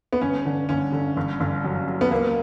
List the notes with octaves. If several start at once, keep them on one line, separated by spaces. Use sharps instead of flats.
B3
G1 C#4
D3
G1 C#4
D3
G1
G1
F#2
F#2
B3
C#2 A#3